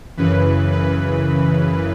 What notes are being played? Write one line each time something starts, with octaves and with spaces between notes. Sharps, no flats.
F#2 C#3 E3 B4
B4